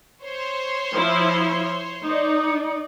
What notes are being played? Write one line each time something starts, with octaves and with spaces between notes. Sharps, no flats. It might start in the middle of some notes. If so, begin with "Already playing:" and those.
C5 C#5
F3 E4
D#4 D5